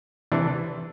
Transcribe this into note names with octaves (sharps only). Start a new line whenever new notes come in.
C3 E3 D4